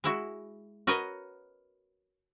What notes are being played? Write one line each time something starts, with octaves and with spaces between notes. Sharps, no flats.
G#3 E4 F#4
F#4 A#4 B4 C#5 D#5